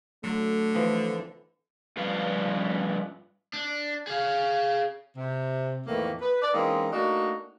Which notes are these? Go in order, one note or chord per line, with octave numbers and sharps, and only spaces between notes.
D3 F#3 A3
E3 F3 B3
G2 F3 B4 F5
D4
G#4 F5
C3
F2 A2 D#3 E3 A3 A#3
B4
D5
E3 G#3 A#3 C4 C#4 D#4
A3 A#3 D4 D#4 F#4